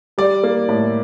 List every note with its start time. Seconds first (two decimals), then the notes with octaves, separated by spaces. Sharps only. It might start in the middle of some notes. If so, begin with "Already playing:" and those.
0.18 G3 D5
0.43 A#3
0.69 A2